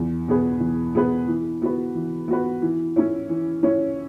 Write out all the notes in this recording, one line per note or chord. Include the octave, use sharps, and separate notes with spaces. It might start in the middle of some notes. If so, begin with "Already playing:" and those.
Already playing: E2
B2 B3 G#4 B4
E2
B2 B3 G#4 B4
E3
B3 F#4 B4
E3
B3 F#4 B4
E3
C#4 E4 C#5
E3
C#4 E4 C#5